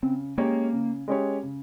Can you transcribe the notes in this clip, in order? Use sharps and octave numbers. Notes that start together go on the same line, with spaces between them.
C#3 C4
G#3 A#3 C#4 G4 C#5
C#3
G#3 C#4 G4 C#5
C#3